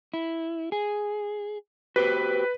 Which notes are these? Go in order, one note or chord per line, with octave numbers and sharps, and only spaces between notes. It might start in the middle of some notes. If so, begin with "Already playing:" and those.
E4
G#4
F#4 G4 B4 C5